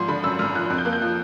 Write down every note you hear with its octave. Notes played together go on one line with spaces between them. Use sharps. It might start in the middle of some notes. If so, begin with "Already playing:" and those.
Already playing: G#1 F3 C6
D3 B5
F#2 E6
G#1 F6
F3 F#6
F2
G6
A#3 F#6
G6
F3